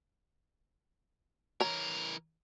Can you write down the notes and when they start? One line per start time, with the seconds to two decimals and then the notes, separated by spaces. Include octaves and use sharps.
1.60 E3 A#4 C#5 A#5